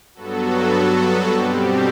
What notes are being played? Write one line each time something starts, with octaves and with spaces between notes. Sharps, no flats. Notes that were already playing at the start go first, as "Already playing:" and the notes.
G2 F#3 B3 F#4 A4
B2 G3 C4 G4